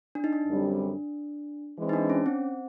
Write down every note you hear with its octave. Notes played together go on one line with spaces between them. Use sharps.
D4
D#4
D4
F#2 D3 G3 C4
E3 G#3 C4
D#4
D4
C#4
C4